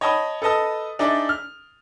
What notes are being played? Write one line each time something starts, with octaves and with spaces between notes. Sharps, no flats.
C#5 D#5 G5 A5 B5 D#6
A4 B4 D#5 A5 D#6
D4 D#4 G#4 D5 E5
F6